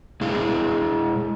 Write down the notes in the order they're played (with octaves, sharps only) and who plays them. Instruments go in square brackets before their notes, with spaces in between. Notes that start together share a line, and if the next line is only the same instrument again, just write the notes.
[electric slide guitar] G#3 E4 G#4 F5